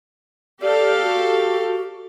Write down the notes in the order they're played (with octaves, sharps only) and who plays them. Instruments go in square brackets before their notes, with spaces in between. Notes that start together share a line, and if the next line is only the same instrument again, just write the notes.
[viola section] G4 A4 F5 [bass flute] D5
[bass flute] F#4